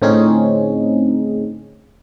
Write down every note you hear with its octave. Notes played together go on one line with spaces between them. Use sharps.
A2 D3 C4 C#4 D#4 G#4